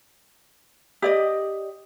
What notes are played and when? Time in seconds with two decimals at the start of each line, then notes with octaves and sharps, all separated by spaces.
1.02 G4 D5 D#5